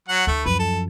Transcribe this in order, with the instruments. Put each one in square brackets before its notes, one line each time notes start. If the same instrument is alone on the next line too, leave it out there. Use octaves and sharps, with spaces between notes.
[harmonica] F#3 F#5
[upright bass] D2 [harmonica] A3
[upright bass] F#2 F3 [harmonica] B4
[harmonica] A4